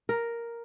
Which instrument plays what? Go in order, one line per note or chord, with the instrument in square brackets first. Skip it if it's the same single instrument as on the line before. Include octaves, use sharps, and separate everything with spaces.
[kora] A#4